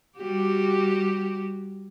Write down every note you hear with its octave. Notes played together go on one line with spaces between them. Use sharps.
G3 F#4 G4